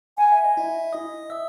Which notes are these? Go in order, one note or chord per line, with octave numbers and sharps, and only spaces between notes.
F#5 G#5
E5
D#5
E4 E5
D#5 D#6
E5 E6